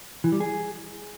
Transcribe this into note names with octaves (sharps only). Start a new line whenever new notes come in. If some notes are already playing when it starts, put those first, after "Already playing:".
E3
G3
G#4